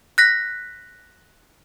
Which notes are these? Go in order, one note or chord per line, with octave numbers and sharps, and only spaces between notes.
F#6 A#6 B6